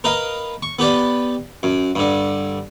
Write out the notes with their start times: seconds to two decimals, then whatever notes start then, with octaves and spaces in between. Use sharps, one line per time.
0.04 A#4 B4 D#5 F5
0.63 C#6
0.79 B3 G4 B4 D5
1.63 F#2
1.95 G2 D3